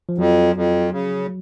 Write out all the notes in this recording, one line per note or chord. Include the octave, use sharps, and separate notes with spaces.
F3
F2 F#3
F2
C#3